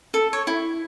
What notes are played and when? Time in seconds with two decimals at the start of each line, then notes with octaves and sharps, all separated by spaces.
0.14 A4
0.33 C#5
0.47 E4